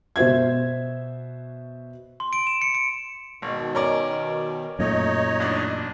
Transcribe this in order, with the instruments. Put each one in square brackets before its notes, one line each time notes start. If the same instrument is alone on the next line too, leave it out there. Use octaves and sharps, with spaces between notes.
[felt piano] B2 F#4 C5 E5 G#6
[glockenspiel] C6
D7
E7
C#7
D7
[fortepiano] G#1 [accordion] B2 D#3
[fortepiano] C#4 A#4 D5
[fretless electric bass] F#2 A#2 A3 [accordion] D#4 C#5 D#5
[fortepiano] A1 D4